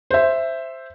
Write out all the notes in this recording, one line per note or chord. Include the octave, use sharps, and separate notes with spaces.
C5 E5